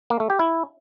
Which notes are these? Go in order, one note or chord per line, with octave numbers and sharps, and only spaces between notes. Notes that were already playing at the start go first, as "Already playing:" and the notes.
A#3
A3
G4
E4